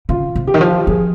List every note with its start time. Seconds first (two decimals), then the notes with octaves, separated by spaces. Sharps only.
0.09 C#3 F4
0.36 C3
0.47 G4
0.54 D#3
0.61 F3
0.69 F4
0.78 G4
0.87 F3 G#4